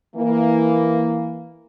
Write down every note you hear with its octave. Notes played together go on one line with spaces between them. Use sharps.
E3 A#3